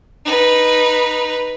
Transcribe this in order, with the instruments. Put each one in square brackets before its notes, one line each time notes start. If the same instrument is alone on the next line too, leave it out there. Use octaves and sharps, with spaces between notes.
[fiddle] D#4 B4